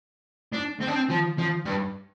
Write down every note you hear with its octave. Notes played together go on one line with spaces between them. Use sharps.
D4
C4
D4
C4
F3
F3
G2